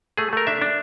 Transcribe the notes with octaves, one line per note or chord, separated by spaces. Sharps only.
A3 G#4
A3 A#4
D4 E5
D4